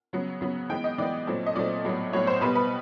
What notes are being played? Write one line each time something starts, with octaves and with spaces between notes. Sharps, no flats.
C#3 F#3 B3
C#3 F#3 B3
E3 G#3 B3 G5
D#5
E3 G#3 B3 D5
A#2 F#3 A3 C4
D#5
A#2 F#3 A3 C4 D5
A2 F#3 B3
A2 F#3 B3 C#5
C5
B2 G3 B3 B4
B4